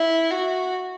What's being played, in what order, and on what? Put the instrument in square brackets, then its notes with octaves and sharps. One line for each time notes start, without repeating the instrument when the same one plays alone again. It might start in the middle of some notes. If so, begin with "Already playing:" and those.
Already playing: [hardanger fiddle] E4
F#4